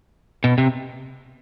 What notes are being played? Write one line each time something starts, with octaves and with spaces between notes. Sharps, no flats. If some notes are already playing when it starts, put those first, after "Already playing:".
B2
C3